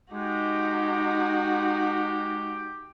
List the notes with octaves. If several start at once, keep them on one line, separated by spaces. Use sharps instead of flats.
G#3 D#4 F#4 G4